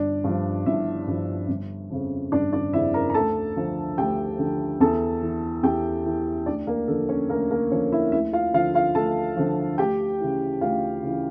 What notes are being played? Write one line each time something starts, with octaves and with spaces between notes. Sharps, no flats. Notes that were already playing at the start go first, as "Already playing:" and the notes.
Already playing: G1 D4 D5
G2 F3
G1 E4 E5
G2 F3
G1
F2 C#3
G1 D4 D5
D4 D5
F2 C#3 E4 E5
A#4 A#5
A#5
D2 A4 A5
D3 F3
D2 G4 G5
D3 F3
E2 A4 A5
E3
E2 G4 G5
E3
D2 D4 D5
A#3 A#4
D3 F3 A4
C#4 C#5
D2 A#3 A#4
A#3 A#4
D3 F3 C#4 C#5
E4 E5
D2 E4 E5
F4 F5
D3 F3 F4 F5
F4 F5
D2 A4 A5
D3 F3
D2 G4 G5
C#3 E3
D2 F4 F5
C#3 E3